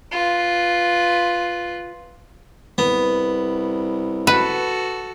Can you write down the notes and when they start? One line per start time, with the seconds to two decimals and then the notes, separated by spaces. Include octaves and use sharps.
0.12 F4 B4
2.78 C2 B3
4.27 F#4 A4 B4